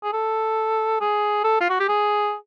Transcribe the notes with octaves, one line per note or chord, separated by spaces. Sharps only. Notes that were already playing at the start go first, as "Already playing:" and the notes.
G#4
A4
G#4
A4
F4
F#4
G4
G#4